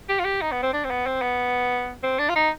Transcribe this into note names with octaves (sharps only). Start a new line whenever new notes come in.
G4
F4
G4
D#4
B3
C4
D4
C4
B3
C4
B3
C4
D4
F4
D#4